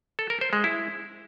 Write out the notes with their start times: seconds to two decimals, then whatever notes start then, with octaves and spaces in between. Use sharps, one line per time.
0.19 A4
0.30 A#4
0.41 C5
0.53 G#3
0.64 E4